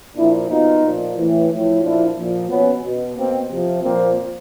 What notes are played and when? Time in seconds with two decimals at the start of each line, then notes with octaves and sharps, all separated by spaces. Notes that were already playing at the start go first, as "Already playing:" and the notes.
0.16 A#2 F3 D4 E4
0.49 B2 D#4 F4
0.83 A#2 F3
1.16 A2 E3
1.50 A2 F3
1.82 A#2 F3 D4 E4
2.17 A#2 F3
2.49 B2 B3 C#4
2.83 B2
3.16 B2 A#3 C4
3.49 C3 F3
3.82 A#2 F3 A#3 C4